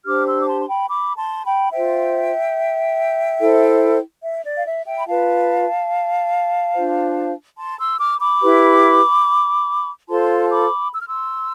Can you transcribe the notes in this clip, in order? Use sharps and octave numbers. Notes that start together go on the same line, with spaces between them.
D4 G4 C5 D6 F6
C6 E6
D6
A5 C6
C6
G5 B5
B5 D6
A5 C6
G5 B5
F4 C5 E5 G5
E4 A4 C5
E5
D5
F5
E5
E5 G5
B5
F4 B4 F5 A5
D4 F4 C5
A5 C6
C6 E6
D6 F6
B5 D6
E4 G4 B4
F4 A4 C5 A5 C6
B5 D6
E6
F6
C6 E6